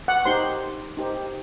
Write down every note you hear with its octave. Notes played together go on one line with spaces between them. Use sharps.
F#5
D#4 G4 C5 C6
D#4 G4 C5